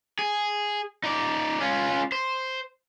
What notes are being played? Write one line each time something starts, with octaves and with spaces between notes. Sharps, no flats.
G#4
D#4 D5
C#4 F4
C5